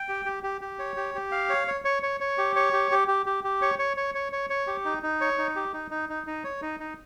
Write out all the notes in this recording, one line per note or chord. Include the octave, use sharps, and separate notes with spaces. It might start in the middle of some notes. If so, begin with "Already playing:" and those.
Already playing: G5
G4
G4
G4
G4
C#5
G4
G4
F5
C#5
C#5
C#5
C#5
C#5
G4
C#5
G4
G4
G4
G4
G4
C#5
C#5
C#5
C#5
C#5
C#5
G4
D#4
D#4
C#5
D#4
G4
D#4
D#4
D#4
D#4
C#5
D#4
D#4